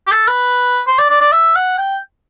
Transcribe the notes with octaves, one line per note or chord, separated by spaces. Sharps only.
G4
A4
B4
C5
D5
D5
D5
E5
F#5
G5